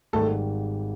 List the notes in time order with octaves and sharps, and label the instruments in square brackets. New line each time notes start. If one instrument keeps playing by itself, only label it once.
[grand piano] G#1 G#2 D#3 G3 [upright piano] A3 A4